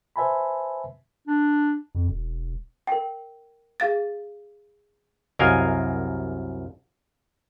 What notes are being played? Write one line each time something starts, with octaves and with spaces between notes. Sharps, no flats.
B4 C5 E5 G#5 A5 B5
D4
F2
E1
A#4 G5
G#4 F5 A6
C2 F#2 A#4 D#5 F5 G#5